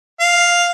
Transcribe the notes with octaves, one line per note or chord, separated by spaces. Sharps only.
F5